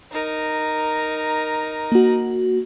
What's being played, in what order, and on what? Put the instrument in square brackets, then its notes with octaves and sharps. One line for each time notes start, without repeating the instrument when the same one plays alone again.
[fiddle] D#4 A#4
[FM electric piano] A#3 F#4